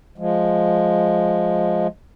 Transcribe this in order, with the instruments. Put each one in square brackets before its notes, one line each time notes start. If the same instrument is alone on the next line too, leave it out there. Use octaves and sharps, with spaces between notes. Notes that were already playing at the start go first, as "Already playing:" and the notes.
[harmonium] F3 G#3